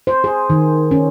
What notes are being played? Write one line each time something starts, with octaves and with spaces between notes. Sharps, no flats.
C5
G#4
D#3
C#4